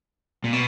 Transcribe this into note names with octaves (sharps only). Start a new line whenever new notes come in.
A#2
B2